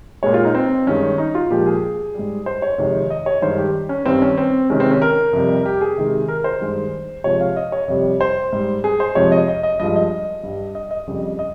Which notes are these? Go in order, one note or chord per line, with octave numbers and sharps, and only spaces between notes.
A#2 G#3 C#5
F4
D#4
C4
G2 D#3 G#3 C#4
D#4
F4
A#2 F3 G#3 G4
G#4
G#2 G3
C5
C#5
F2 C3 D#3 G#3
D#5
C#5
G2 D#3 G#3 C5
G4
C#4
G2 D#3 G3 C4
C#4
C4
C3 D#3 G#3 C#4
C4
C#4
A#4
F2 C3 G3
G4
G#4
C3 D#3 G#3
A#4
C5
G2 D#3 G#3
C3 F3 G#3 C#5
F5
D#5
C#5
F2 C3 G3
C5
G#2 G3
G#4
C5
F2 C3 F3 G#3 C#5
D#5
D#5
D#5
G2 F3 G#3 D#5
D#5
G2 G3
D#5
D#5
F2 C#3 G3
D#5